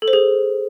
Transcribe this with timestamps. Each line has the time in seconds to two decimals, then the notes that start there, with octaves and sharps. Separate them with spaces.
0.02 A4
0.08 C5
0.13 G#4